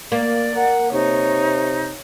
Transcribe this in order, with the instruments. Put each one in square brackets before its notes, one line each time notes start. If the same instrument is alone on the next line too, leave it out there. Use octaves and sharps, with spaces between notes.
[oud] A#3 [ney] D5
[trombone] A#4 [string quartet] F#5
[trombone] C3 [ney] D#4 [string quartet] C#5